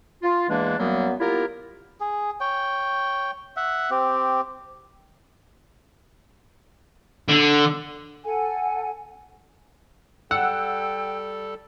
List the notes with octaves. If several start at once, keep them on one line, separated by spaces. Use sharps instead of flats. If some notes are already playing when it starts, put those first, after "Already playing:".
F4
E2 E3 G#3 A#3 D4
F#2 F#3 G3 A#3 B3
A#3 B3 E4 F4 G4 A#4
G#4
C#5 G5
E5 F#5
C4 G4
D3
A4 F#5 G#5
G3 A4 F#5 G5 E6